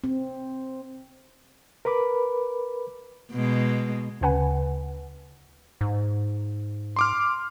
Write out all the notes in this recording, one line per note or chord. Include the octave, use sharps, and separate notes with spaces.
C4
A#4 B4 B5 D6
B2 G#3
D2 C#3 B4 F#5 G#5
G#2
C6 D6 F6